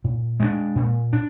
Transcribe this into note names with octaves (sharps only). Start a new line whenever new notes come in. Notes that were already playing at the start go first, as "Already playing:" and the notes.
A#2
G#3 B3 D4
A#2
D4